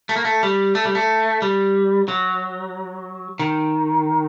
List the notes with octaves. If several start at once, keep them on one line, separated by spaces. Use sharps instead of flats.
A3
A#3
A3
G3
A3
G3
A3
G3
F#3
D#3